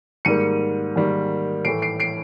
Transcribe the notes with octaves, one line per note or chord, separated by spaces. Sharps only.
G#2 D#3 G3 A#3 C#7 D#7
G#2 D#3 G3 A#3
A2 E3 A3 C7 D7
C7 D7
C7 D7